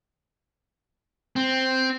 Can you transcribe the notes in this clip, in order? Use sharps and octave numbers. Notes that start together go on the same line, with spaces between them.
C4